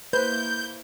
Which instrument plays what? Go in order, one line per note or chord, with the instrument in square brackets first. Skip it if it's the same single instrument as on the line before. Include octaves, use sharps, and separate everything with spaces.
[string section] A#3 E4 [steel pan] B4 [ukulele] C5 [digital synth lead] G6